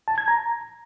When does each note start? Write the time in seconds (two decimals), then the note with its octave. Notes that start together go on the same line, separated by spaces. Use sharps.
0.08 A5
0.18 G#6
0.28 A#5